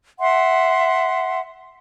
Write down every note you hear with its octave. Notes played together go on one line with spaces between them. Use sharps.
E5 F#5 C6